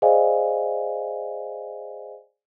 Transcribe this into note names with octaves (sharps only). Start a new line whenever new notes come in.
G#4 C5 D5 D#5 F5 G#5